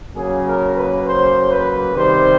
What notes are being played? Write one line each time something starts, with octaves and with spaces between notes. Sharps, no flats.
C#3 F#3 A#3 G#4
A#4
B4
C5
B4
C3 D#3 G3 C5